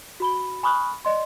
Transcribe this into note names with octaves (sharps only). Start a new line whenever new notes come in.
F#4 B5 G7
G#5 B5 C#6 D#6 F6 F#6
D5 D#5 C6